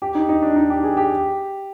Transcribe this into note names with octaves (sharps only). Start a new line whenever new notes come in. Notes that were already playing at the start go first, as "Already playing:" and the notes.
G4
D#4
D#4
D4
D#4
G4
G#4
G4